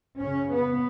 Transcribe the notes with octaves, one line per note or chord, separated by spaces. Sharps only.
F#2 C#3 C#4
B3